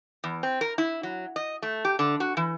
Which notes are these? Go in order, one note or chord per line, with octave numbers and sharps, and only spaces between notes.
E2
C4
A#4
E4
F#3
D#5
A3
G4
D3
F#4
E3